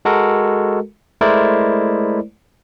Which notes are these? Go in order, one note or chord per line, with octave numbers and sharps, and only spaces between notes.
G#3 F#4 A4 A#4
G#3 A3 E4 A#4 C5 D5